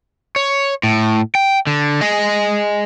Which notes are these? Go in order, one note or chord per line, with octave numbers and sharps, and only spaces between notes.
C#5
A2
G5
D3
G#4 D#5